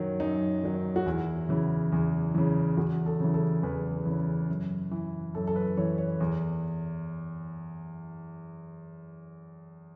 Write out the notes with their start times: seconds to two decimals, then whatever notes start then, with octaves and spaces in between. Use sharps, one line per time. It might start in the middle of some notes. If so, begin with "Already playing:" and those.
Already playing: F#2 D#3 F#3
0.20 F#2 D#4
0.63 D#3 F#3
0.96 F#4
1.06 E2 E4
1.49 C#3 E3
1.92 E2
2.35 C#3 E3
2.77 E2 F#4
3.06 A4
3.20 C#3 E3
3.34 A4
3.63 E2 B4
4.05 C#3 E3
4.49 F#2
4.91 E3
5.34 F#2 A4
5.47 A4
5.56 B4
5.77 E3 C#5
5.98 C#5
6.20 E2